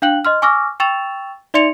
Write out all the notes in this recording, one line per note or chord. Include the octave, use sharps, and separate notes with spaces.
D4 F5 G5 F#6 F#7
D#5 C6 F6
G#5 C#6 D6 E6 F6 A#6
G5 C#6 E6 A6 E7 F7
D#4 D5 E5 C6 C#7 F7